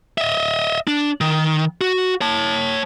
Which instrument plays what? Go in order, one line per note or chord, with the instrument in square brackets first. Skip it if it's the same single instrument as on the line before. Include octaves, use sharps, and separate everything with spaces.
[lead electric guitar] D#5 E5
D4
D#3
F#4
C#5 A5